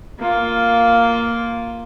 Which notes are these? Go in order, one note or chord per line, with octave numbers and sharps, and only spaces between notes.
A#3 F4